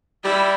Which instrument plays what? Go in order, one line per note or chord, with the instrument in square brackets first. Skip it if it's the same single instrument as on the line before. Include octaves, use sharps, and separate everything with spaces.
[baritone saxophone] G3 [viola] E4